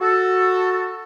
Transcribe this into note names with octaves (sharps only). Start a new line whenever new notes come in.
F#4 A4